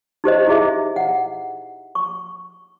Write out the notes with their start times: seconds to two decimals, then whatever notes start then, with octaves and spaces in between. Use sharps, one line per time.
0.24 D#4 G4 C5 D#5
0.47 D#4 E4 G#4 D#5 E5
0.96 F#5
1.95 C#6